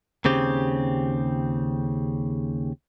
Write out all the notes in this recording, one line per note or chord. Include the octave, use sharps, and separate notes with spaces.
D#2 C#3 C4 G4